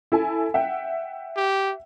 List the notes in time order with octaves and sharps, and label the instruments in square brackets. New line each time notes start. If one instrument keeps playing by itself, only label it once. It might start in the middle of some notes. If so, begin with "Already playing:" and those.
[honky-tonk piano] E4 A4 G#5
E5 F#5 G5
[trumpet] G4